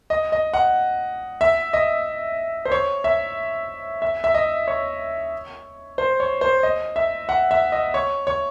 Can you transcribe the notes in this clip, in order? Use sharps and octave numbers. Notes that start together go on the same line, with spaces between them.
D#5
D#5
F#5
E5
D#5
C5
C#5
E5
E5
E5
D#5
C#5
C5
C#5
C5
D#5
E5
F#5
E5
D#5
C#5
C#5